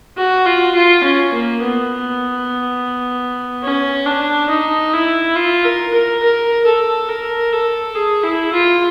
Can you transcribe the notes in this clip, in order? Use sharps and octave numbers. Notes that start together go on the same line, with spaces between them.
F#4
F4
F4
C#4
A#3
B3
C#4
D4
D#4
E4
F4
A#4
A#4
A#4
A4
A#4
A4
G#4
E4
F4